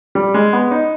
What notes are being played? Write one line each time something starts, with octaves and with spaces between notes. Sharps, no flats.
G3
G#3
B3
D#4